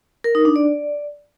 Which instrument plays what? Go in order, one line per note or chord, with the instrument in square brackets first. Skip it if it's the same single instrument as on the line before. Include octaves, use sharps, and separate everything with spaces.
[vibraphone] A#4
D#4
D4
D5